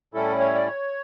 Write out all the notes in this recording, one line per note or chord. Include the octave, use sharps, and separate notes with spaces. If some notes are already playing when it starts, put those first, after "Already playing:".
A2 G3 C#4 E4 A4
C#5
D5
C#5